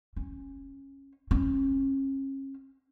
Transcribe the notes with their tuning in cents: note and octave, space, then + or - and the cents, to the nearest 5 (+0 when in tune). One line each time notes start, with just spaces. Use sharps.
C#4 -15
C#4 -35